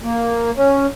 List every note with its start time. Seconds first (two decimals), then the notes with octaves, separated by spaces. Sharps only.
0.03 A#3
0.57 C#4